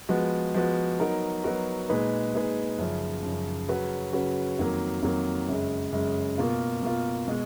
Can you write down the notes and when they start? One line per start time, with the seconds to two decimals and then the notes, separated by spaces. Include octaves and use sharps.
0.09 F3 G#3 B3 F#4
0.54 F3 G#3 B3 F#4
0.99 F#3 B3 D#4 F#4 A#4
1.44 F#3 B3 D#4 F#4 A#4
1.89 A#2 G#3 D#4 G#4 B4
2.34 A#2 G#3 D#4 G#4 B4
2.78 F#2 C#3 F3
3.23 F#2 C#3 F3
3.69 C#3 F#3 C#4 F#4 B4
4.13 C#3 F#3 C#4 F#4 B4
4.59 F2 D#3 F#3 A#3
5.02 F2 D#3 F#3 A#3
5.48 F#2 C#3 G#3
5.92 F#2 C#3 G#3
6.38 B2 A#3 F4
6.83 B2 A#3 F4
7.28 B2 G#3